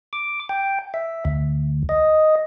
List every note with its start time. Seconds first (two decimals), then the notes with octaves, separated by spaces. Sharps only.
0.13 D6
0.49 G5
0.94 E5
1.25 D2
1.89 D#5